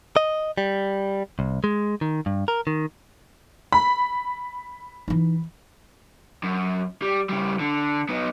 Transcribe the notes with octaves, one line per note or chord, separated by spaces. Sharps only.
D#5
G3
C2
G#3
D#3
G2
A#4
D#3
B5
E3 D#4
F#2
G3
C#3 G3
D3
B3 D#4